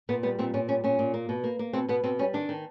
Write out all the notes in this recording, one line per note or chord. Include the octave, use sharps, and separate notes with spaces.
A#2 B3
G3 B3
A#2 C4
A#2 C#4
G3 C#4
A#2 C#4
A#2
A#3
B2
A#3
A#3
B2 C4
B2 B3
B2 C4
G3 C#4
D#3 D4
D#3